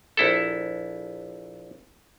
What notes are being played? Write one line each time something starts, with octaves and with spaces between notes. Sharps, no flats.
A#1 E4 A4